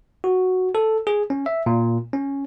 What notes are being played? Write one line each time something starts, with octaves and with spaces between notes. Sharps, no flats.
F#4
A4
G#4
C#4
E5
A#2
C#4